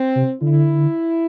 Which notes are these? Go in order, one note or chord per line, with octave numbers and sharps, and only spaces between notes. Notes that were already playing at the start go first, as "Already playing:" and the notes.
Already playing: C4
C3
D3 E4